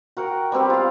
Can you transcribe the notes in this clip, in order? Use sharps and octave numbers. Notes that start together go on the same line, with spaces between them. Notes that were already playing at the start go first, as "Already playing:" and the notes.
F#4 A#4 F#5 G5
G3 B3 C4 G4
F4 F5